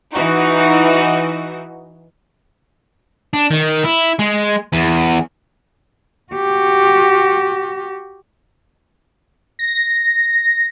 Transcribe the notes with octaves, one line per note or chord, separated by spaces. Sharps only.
E3 D#4 F#4
D4
D#3
E4
G#3
E2
F#4 G4
A#6